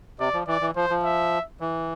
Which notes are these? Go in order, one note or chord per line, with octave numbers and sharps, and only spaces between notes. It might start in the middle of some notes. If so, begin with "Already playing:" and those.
C3 D5
F3
E3 D5
E3
F3 C5
F3
E5
E3